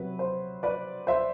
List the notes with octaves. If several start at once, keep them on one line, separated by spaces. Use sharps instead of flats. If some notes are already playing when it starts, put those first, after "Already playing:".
Already playing: C3 F#3 B4
C5
B4 D5
C5 E5